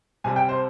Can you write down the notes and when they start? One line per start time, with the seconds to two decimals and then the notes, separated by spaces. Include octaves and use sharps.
0.24 C2 C3 G3 G#5
0.36 G5
0.49 C5